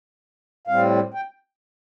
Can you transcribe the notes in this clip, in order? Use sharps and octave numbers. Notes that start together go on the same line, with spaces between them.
A2 G3 C4 F5
G5